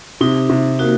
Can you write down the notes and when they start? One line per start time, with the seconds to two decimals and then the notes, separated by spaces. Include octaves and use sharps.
0.21 C3 D#4
0.50 C3
0.79 A#3 D#4 F#4